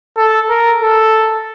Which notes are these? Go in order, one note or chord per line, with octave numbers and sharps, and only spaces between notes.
A4
A#4
A4